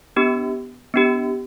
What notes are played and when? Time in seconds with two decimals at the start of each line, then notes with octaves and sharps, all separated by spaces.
0.16 B3 D4 G4
0.94 B3 D4 G4